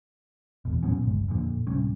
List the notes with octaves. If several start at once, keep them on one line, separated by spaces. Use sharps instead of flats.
E2 B2
A#2 F#3 B3 C#4
G1 C#2
F2 A#2 D3
D1 C3 G3 C#4